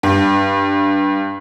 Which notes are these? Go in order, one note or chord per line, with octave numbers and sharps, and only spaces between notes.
G2